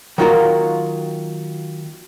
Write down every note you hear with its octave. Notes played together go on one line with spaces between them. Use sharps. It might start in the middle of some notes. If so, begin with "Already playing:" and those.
D#3 F#3 A#3 F4 F#4 A#4